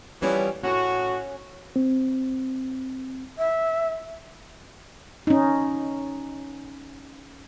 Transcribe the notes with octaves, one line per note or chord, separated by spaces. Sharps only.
E3 F3 G3 B3 C#4
A2 C#4 F#4
C4
E5
C#4 D#4